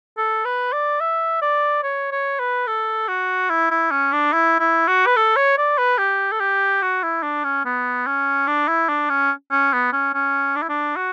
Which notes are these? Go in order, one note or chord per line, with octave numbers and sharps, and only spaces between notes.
A4
B4
D5
E5
D5
C#5
C#5
B4
A4
F#4
E4
E4
C#4
D4
E4
E4
F#4
B4
A4
C#5
D5
B4
G4
A4
G4
F#4
E4
D4
C#4
B3
C#4
D4
E4
D4
C#4
C#4
B3
C#4
C#4
D4
E4
D4
F#4